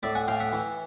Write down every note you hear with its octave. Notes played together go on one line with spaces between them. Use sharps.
A2 D5 E5
F#5 G#5
A2 F5 G5
E5 F#5
E3